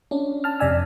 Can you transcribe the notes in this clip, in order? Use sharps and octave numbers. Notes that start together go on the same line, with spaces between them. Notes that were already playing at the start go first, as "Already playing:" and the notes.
C#4 D4
A5 F6
F2 C3 D5 G#5 E6